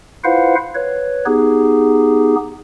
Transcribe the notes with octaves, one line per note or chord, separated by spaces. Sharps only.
E4 F4 B4 C5 F5 F#5
B4 C#5
B3 D#4 G4 G#4